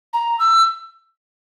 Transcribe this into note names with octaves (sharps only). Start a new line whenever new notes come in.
A#5
E6